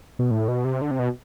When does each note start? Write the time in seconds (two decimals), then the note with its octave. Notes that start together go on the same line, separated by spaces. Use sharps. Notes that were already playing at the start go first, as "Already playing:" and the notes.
0.19 B2
0.31 A2
0.48 B2
0.65 C3
0.81 D3
0.91 C3
0.99 B2